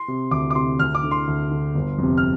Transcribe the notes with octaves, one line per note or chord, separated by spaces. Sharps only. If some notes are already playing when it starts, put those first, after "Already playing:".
Already playing: C6
C3
D2 D6
D6
C3 C6
D2 F6
D6
D3
C6
D2
D3
G1
F2 C3
F6